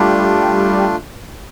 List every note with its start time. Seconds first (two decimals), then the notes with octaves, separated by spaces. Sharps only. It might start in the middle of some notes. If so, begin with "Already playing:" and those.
Already playing: G3 A3 D4 F4